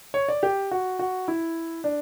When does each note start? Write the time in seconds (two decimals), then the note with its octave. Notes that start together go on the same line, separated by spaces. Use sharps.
0.14 C#5
0.29 D5
0.43 G4
0.71 F#4
0.99 F#4
1.28 E4
1.84 D4